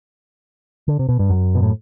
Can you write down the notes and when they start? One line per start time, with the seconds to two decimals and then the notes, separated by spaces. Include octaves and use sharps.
0.88 D3
0.99 C3
1.09 B2
1.19 G2
1.30 F#2
1.55 B2
1.62 A2